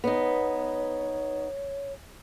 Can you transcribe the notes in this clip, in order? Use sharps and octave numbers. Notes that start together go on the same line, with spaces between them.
B3 D#4 C#5